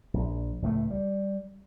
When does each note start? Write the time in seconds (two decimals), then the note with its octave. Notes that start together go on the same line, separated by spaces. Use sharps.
0.14 A#1
0.62 C#2 A2 G3 A3
0.90 G3